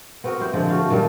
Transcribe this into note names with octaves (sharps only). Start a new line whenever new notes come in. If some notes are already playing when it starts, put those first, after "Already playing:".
B3 C4 F#4 A#4
E4 G4 C5
A#2 D3 F3 G#3
A3 F#4 F5
A#2 D#3 G3 A3